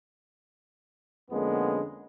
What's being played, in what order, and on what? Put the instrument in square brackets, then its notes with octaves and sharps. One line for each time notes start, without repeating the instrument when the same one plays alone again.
[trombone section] F2 D3 G#3 A#3 B3 C#4